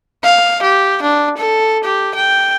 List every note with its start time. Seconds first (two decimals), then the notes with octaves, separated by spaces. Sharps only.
0.23 F5
0.62 G4
1.02 D4
1.37 A4
1.84 G4
2.15 G5